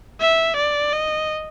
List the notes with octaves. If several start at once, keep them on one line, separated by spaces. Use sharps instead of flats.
E5
D5
D#5